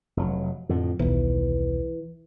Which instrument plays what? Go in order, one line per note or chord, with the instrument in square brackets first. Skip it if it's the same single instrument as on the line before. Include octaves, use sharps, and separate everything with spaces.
[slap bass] F1 F#3
F2 A2 D3
[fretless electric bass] D#1 B1 [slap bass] E3